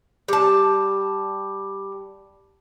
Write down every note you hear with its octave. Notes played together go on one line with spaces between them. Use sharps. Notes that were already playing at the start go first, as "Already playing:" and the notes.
G3 A5